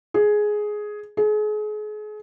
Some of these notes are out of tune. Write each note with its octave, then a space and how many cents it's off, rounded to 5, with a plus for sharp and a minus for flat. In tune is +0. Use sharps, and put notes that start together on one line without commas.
G#4 +10
G#4 +35